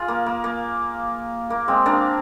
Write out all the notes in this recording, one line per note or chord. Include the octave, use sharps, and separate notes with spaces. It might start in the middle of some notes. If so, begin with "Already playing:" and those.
Already playing: F4 G#4
A#3
A#3
A#3
A#3
G#3 C4
A#3 D4